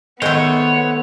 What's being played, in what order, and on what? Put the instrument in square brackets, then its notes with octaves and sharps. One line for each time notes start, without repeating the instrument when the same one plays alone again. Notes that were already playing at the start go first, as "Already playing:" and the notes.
[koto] D#3 G#3 [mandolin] A3 C5 [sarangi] B3 [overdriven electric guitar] C#5